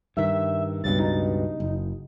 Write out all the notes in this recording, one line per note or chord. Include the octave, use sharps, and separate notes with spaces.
G2 D#3 E5
C#2 G2 B2 A6
D#4
F#1